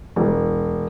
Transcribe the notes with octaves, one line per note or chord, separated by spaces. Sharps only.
E1